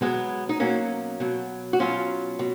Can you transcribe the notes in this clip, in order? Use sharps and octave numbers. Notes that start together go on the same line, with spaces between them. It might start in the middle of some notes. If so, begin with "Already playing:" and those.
B2 F#3 G#3 B3
D#4
B2 F#3 A#3 C#4
B2 F#3
F#4
B2 F#3 C#4 F4
B2